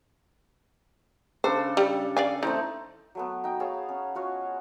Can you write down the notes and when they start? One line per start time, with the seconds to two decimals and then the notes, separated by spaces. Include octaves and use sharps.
1.44 C#3 D4 A4 C5
1.77 G3
2.17 D5 F5 G#5
2.43 E3 A3 C4 D#4
3.15 F#3 A3 B3
3.44 D#4 G5
3.60 G#4 C#5 F5 A5
3.89 C#4
4.15 F4 F#4 C#5